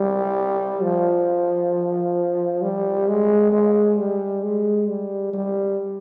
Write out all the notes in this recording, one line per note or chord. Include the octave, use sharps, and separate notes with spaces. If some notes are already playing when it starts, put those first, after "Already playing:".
Already playing: G3
F3
G3
G#3
G#3
G3
G#3
G3
G3